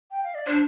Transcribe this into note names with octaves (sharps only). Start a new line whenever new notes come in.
G5
F5
D5
D4 C5